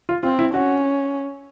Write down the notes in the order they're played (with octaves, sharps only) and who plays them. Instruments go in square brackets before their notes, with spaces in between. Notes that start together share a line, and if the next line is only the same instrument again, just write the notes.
[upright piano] F4
[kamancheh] C4 [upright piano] F4
[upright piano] E4
[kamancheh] C#4 [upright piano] F#4